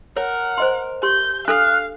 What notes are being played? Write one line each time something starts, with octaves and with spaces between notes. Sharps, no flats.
A#4 C#5 F#5
C5 D#5 C6
G4 C6 G6
D4 A4 F5 F6 F#6